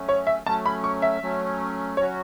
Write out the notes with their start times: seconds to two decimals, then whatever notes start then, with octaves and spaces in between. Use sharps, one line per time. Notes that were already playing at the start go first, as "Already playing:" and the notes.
Already playing: F#3 A3 C#4
0.09 C#5
0.27 E5
0.46 F#3 A3 C#4 A5
0.66 B5
0.84 C#6
1.02 E5
1.22 F#3 A3 C#4
1.97 F#3 C#4 F#4 C#5